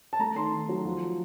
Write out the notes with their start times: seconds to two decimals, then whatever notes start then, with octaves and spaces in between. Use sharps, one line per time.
0.13 A5
0.19 A3 A#5
0.36 D#3 C6
0.53 D#3
0.69 F#3
0.85 F3